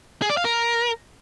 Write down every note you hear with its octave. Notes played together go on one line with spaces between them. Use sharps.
G#4
D5
F5
A#4